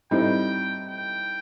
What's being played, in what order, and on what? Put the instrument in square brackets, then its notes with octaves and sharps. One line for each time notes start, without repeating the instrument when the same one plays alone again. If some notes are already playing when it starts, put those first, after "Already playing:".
[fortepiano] A2 G3 C4 D#4 [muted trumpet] G5
[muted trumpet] G5